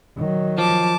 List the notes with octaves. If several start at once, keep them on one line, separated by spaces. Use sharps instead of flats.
D#3 F#3
F3 A5 D6